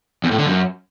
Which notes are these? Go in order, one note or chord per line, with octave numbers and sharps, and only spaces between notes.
E2
A2
D3
F#2